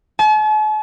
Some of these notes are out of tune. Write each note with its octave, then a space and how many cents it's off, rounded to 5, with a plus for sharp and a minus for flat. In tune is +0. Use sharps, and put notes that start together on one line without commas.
A5 -45